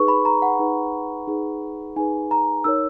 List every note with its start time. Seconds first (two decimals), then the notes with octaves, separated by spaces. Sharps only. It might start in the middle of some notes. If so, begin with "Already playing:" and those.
Already playing: D#4 G#4 B4 C#6
0.08 B5
0.25 A#5
0.42 F#5
0.60 D#4 G#4 B4
1.27 D#4 G#4 B4
1.96 D#4 G#4 B4 G#5
2.31 A#5
2.64 D#4 A#4 C#5 E6